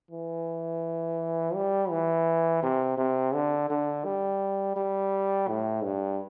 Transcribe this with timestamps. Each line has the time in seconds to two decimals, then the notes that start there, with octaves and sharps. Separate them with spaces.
0.11 E3
1.55 G3
1.90 E3
2.63 C3
2.98 C3
3.34 D3
3.70 D3
4.05 G3
4.76 G3
5.48 A2
5.84 G2